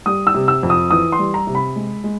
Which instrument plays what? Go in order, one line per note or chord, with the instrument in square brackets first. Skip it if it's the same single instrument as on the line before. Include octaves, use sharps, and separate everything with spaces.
[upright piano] G3 D#6
E6
C3
E6
F2
D#6
E3 D#6
C6
G3
A#5
C3
B5
G#3
G#3